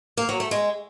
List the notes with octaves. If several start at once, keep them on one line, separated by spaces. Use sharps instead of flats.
A#3
F#3
A3
G#3